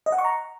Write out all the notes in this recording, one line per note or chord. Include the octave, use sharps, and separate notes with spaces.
D#5
F#5
C#6
A#5